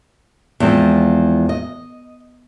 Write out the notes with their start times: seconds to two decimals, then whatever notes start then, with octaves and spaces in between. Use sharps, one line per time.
0.60 E2 F3 G#3 C4
1.49 D#5